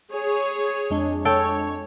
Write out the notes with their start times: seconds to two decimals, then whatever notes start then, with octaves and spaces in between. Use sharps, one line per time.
0.12 G#4 C#5
0.90 F2 G#3 D4
1.25 A4 C#5 G5